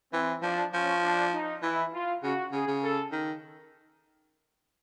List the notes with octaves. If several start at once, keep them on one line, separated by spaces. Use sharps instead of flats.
E3 C4
F3 D4
F3 C#4
D4
D#4
E3 E4
F4
C#3 F#4
C#3 G#4
C#3
A4
D#3